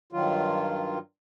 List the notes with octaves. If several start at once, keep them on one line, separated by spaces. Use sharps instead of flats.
G2 D#3 F#3 F4